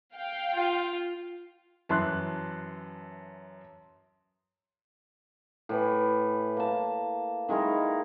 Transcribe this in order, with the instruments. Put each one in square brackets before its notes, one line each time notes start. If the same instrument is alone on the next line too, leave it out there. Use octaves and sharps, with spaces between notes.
[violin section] F5 G5
[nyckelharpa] F4
[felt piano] F#2 E3 A5 [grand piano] E5 C6 F#6
[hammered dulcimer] A2 E3 B4
A#3 A5
D#3 G#3 E4 A#4